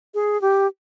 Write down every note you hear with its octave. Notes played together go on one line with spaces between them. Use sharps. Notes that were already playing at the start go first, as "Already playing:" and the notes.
G#4
G4